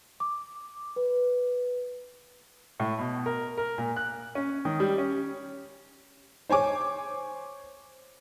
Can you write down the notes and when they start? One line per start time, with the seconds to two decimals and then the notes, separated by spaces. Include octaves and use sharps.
0.20 D6
0.96 B4
2.80 A2
2.98 B2
3.26 A#4
3.57 A#4
3.78 A#2
3.96 F#6
4.35 C#4
4.65 D#3
4.80 G3
4.98 C#4
6.49 C5 C#5 G#5 D6